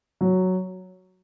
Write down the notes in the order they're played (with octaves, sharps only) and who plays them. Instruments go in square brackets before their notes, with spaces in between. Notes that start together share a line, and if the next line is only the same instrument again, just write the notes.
[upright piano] F#3